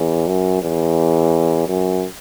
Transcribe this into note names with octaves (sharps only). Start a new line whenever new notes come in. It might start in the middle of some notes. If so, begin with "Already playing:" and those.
Already playing: E2
F#2
E2
F#2